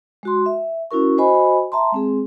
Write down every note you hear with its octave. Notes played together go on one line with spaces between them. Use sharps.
G#3 F#4 C6
E5
C#4 E4 F#4 A#4 C#6
F#4 C5 D#5 G#5 B5
E5 A5 A#5 C6
G#3 C4 G#4